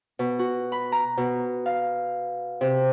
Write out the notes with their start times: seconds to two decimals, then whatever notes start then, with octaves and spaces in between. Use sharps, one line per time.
0.19 B2
0.39 F#4
0.72 B5
0.92 A#5
1.17 B2
1.66 F5
2.61 C3